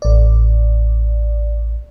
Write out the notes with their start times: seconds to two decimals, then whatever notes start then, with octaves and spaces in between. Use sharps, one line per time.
0.02 A1 D5